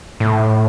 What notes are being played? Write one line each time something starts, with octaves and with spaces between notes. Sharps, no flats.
A2